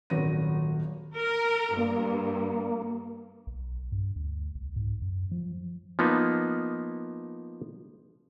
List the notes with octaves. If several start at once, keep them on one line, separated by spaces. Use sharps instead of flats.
D#1 G#1 F#3 C#5 A#6 D#7
A#4
G2 A#3
B1
G2
D2
C2
G#2
F#2
F3
F3 A#3 B3 D#4